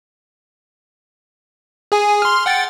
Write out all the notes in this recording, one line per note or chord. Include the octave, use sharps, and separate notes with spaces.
G#4 G#5
C6 F6
F#5 G5 A6